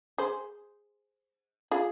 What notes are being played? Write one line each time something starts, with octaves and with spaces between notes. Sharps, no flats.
G#4 C5
F4 G#4